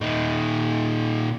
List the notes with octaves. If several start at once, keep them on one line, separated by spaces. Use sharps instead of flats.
A#2 D#4